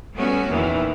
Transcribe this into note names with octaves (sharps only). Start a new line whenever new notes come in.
G3 A3 B3 C#4 F#4
E2 A#2 D#3 E3